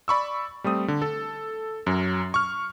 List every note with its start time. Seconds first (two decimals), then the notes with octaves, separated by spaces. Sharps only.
0.08 D5 B5 C#6 E6
0.64 G3 A3 C4 D#6
0.88 D3
1.02 A4
1.87 F#2 F#3
2.34 C#6 F6